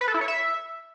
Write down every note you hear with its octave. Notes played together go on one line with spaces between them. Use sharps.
B4
A4
E4
C#5
E5